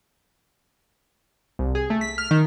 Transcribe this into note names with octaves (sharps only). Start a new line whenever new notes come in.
C2
G#4
A3
B6
F6
D#3